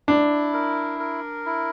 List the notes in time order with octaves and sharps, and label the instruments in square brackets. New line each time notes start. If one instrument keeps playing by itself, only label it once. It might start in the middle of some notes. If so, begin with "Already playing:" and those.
[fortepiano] D4 [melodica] E4
[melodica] A#4
A#4
E4